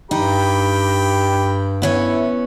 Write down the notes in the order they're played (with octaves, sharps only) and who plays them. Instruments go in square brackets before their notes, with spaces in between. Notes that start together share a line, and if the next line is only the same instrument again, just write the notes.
[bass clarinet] G2 [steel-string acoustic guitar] D#4 [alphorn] G4 [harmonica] G5 B5
[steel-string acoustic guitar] B3 C#4 C#5 [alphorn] E4